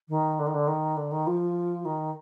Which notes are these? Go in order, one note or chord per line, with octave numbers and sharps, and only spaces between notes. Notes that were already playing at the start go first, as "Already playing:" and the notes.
D#3
D3
D#3
D3
D#3
D3
D#3
F3
D#3